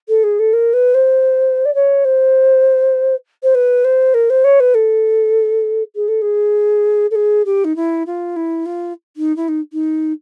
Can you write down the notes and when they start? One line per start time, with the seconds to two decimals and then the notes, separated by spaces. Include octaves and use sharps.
0.08 A4
0.23 G#4
0.39 A4
0.53 A#4
0.73 B4
0.94 C5
1.65 D5
1.74 C#5
2.04 C5
3.43 C5
3.54 B4
3.84 C5
4.14 A#4
4.29 C5
4.44 C#5
4.60 B4
4.74 A4
5.95 G#4
6.08 A4
6.21 G#4
7.10 A4
7.15 G#4
7.45 G4
7.64 D#4
7.75 E4
8.06 F4
8.36 E4
8.65 F4
9.16 D#4
9.36 E4
9.48 D#4
9.72 D#4